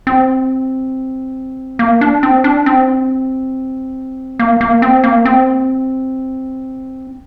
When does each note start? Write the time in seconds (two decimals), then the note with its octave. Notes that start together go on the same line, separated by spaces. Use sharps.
0.07 C4
1.79 A#3
2.01 D4
2.23 C4
2.44 D4
2.66 C4
4.39 A#3
4.61 A#3
4.82 C4
5.04 A#3
5.25 C4